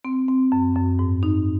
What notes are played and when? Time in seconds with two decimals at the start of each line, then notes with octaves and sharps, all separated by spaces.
0.05 C4
0.28 C4
0.52 F#2
0.75 F#2
0.99 G#2
1.23 D#4